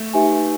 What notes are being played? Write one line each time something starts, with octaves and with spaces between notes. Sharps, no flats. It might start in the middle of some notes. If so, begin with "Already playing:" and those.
Already playing: A3
D#4 G4 B4 E5 G#5